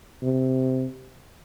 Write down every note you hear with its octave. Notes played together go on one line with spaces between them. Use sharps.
C3